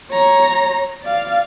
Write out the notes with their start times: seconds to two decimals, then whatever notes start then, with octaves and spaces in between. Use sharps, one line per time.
0.10 C#5 A#5
1.03 D5 F5